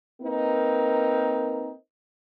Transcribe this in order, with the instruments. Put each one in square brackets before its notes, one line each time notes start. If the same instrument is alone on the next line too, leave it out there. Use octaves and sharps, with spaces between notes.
[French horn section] A#3 C4 D#4 A#4 B4